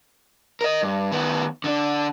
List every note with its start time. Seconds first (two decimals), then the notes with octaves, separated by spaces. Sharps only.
0.61 A#4 D#5
0.83 G2
1.12 D#3 B3
1.64 D3 D4